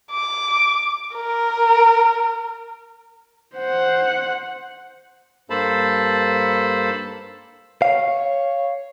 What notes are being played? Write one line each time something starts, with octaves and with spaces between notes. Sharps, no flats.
D6
A#4
C5 F#5
G2 A#3 A4 C5 A5 B5
C#5 F5